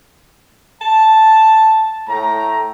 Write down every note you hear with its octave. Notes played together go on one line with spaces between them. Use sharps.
A5
A2 A3 G5 A#5